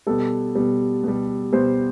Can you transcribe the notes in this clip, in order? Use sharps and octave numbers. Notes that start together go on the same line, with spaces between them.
B2 G3 A4
B2 G3
B2 G3
B2 G3 C5